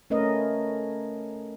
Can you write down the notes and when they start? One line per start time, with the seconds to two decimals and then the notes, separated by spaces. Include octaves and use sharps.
0.10 A3 C#4 A#4 B4 D#5